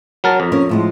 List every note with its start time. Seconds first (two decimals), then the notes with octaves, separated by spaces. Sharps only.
0.24 F#3 A#4 A5
0.40 F2
0.52 C#4 A#4 C#5
0.69 A2 F3 G#3